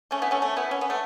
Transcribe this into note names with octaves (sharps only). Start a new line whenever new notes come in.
A3 C#4
B3 E4
A3 C#4
A3 C#4
B3 E4
C#4
B3
A3